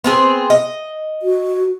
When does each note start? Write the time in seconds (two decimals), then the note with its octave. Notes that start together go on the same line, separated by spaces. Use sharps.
0.04 B3 C4 G#4
0.50 D#5
1.22 F#4